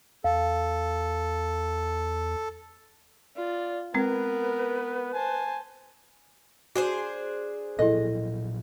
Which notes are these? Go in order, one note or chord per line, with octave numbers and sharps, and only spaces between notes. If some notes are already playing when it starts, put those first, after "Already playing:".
E2 A4 F5
F4 D5
G#3 B3 C4 A#4 B4
C5 G#5 A5
D4 F#4 G#4 C5
A#2 F3 F#3 E4 A4 D#5